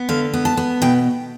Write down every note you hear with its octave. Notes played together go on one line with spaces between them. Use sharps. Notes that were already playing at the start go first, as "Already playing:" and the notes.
Already playing: B3
D3 F5
B3
A5
B3
B2 G5